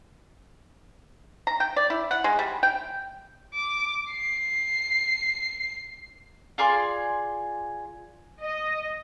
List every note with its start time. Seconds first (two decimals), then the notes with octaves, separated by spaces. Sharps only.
1.47 A#5
1.60 G5
1.76 D5
1.90 E4
2.11 F#5
2.24 G#3
2.39 G3
2.63 G5
3.54 D6
4.11 C7
6.58 F4 G#4 D5 C6
8.40 D#5